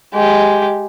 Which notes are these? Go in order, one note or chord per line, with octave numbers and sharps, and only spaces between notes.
G#3 G4